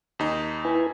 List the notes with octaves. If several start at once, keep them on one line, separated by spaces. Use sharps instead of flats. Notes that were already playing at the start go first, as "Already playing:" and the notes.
D#2 D#4
E4 B4 G#5